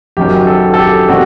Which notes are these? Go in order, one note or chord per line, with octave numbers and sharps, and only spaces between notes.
F#1 F#2 D#3 F#3 G4
A4
A4
G4
C3 D#3 G3 F#4